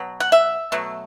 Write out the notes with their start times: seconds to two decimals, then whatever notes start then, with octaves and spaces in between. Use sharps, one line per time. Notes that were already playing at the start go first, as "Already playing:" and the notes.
Already playing: B2 F#3
0.20 F#5
0.32 E5
0.72 B2 F#3 A3